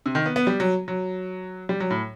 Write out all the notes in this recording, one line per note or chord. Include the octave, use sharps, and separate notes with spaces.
C3
D#3
B3
B3
G3
F#3
F#3
G3
F#3
A2